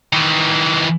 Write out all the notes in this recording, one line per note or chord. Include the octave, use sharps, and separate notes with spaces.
D#3 E3